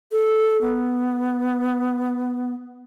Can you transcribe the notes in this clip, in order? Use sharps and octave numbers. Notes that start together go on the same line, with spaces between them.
A4
B3